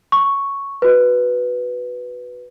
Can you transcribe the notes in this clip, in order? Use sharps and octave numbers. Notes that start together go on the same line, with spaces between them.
C#6
F#4 B4